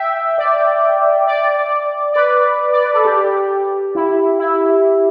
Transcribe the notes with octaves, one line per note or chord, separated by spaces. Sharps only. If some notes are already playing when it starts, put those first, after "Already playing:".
Already playing: E5 G5
D5
D5
D5
B4
D5
B4
A4
G4
E4
E4